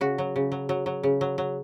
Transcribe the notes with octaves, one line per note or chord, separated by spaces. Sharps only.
C#3 F#4
F#3
C#3
F#3
F#3
F#3
C#3
F#3
F#3